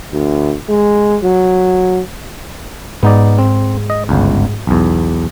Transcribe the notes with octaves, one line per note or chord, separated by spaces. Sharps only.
D2
G#3
F#3
G#2 B3 D#4 D5
C4
D#5
G1 C#2
B1 E2